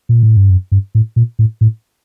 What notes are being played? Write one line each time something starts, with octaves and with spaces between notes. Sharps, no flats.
A#2
A2
G2
F#2
G2
A2
A#2
A2
A2